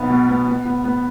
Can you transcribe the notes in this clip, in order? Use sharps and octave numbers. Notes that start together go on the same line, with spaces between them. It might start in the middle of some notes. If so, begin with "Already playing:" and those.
Already playing: B1 B3
B2
B3
B3
B3
B3